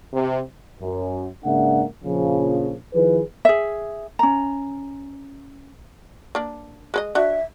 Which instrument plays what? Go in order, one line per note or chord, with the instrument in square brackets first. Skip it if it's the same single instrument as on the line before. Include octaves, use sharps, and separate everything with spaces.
[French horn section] C3
[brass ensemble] F#2
G#2 C#3 A#3 D4 E5 F#5
A#1 C#3 F3
D#3 F3 E4 G#4 B4
[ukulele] G#4 E5
C#4 A#5
[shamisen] A#3 D4
G#3 B4 D#5
[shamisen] D4 F#4 [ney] E5